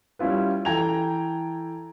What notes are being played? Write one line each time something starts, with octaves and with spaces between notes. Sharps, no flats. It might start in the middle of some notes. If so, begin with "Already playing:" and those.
G3 C#4 E4 F4 B4
E3 A4 G5 A#5 G#6 F7